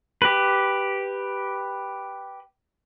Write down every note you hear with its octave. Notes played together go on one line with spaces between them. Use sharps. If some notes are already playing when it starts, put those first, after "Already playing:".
G4 B4